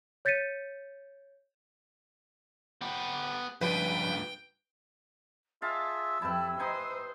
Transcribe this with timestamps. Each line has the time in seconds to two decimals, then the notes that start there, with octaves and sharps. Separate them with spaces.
0.25 C#5 G6 A6 B6 C#7 D#7
2.81 B3 G4
3.61 C#2 G2 F3 B4 G5
5.62 F4 G#4 E5 F5 A5 E6
6.22 F2 E4 G4 B4 A5
6.60 D#4 C5 G#5 D#6